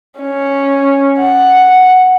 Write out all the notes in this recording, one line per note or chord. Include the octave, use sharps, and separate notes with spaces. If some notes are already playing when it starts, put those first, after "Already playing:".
C#4
F#5